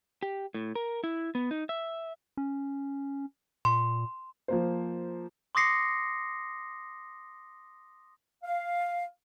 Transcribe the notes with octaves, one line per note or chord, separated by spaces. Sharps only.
G4
A2
A#4
E4
B3
D#4
E5
C#4
A#2 C6
F3 A#3 C5
C6 D6 D#6 A#6 C7 C#7
F5